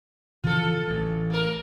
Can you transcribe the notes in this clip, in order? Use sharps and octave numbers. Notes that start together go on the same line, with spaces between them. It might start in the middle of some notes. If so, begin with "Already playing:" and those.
C#3 E3 F3 F4 A4
A1 E3
A#3 A#4